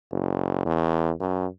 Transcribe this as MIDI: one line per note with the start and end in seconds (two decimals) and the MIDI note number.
0.12 0.63 30
0.66 1.11 40
1.21 1.47 42